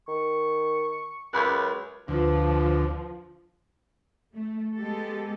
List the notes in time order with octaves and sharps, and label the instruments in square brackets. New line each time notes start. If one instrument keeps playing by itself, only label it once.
[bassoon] D#3 [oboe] C#6
[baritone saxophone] C#2 [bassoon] F#2 [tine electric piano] B5 F#6
[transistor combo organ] D2 [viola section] F3 [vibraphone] F4 B4
[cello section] A3
G#3 B3 G4 A4